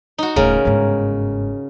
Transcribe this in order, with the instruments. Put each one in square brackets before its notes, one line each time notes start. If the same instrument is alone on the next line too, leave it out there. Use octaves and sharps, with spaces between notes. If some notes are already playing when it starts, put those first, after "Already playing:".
[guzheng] D#4 F#4
[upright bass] D#1 A2 [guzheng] C#3 A#4
[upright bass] G1 G#2